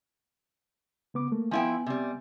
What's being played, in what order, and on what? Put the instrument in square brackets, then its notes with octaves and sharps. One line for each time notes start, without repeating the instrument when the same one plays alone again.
[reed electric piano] C#3 B3 D6
A3 A#3
[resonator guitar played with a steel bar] F3 E4 G5 [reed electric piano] B3 G#5
[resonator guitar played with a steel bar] C3 G3